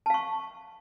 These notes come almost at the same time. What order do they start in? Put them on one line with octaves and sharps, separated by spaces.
A5 F5 C#6